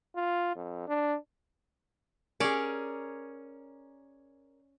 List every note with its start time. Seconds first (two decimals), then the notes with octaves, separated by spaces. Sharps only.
0.16 F4
0.56 F2
0.88 D4
2.40 C#4 G#4 A#4 D5